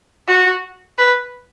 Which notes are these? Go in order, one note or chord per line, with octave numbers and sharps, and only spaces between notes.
F#4
B4